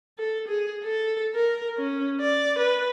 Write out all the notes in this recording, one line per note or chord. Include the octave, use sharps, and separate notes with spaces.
A4
G#4
A4
A#4
C#4
D5
B4